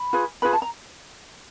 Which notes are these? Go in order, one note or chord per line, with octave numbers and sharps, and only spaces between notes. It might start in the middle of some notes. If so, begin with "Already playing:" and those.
Already playing: B5
F4 G#4 B4
F4 G#4 B4 B5
A5
A#5